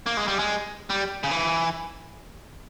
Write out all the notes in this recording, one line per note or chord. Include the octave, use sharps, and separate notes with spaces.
A#3
G#3
G3
G#3
G3
C#3
E3